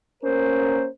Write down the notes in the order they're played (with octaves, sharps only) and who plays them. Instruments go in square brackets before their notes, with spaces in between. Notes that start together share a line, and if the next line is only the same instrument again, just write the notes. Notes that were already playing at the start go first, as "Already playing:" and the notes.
[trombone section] A#3 C#4 A#4 [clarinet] C5